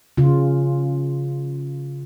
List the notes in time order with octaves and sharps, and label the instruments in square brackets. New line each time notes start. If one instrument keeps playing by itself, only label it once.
[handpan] C#3 F4